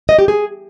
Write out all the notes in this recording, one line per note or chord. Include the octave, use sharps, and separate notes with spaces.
D#5
G4
G#4